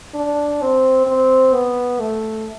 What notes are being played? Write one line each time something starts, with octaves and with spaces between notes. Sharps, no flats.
D4
C4
C4
B3
A3